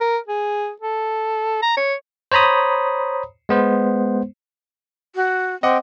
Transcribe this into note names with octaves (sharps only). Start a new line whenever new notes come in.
A#4
G#4
A4
A#5
C#5
C5 C#5 A#5 B5 D#6
G#3 B3 C5
F#4
C4 D#5 F#5 D6